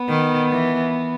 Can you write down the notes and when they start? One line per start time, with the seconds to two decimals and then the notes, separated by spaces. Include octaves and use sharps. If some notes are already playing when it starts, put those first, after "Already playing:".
Already playing: B3
0.09 D#3
0.51 E3